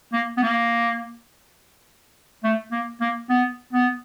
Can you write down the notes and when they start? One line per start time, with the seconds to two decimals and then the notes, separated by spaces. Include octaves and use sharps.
0.13 A#3
0.37 B3
0.42 A#3
2.44 A3
2.72 A#3
3.01 A#3
3.29 B3
3.73 B3